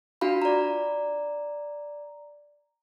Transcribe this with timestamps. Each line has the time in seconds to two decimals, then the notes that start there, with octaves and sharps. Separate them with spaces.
0.21 D4 F4 F#4 F5 B5
0.42 D5 A#5